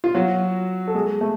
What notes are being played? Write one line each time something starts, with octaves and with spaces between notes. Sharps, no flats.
F4
F#3 F#4
A4
G#3 G#4
A3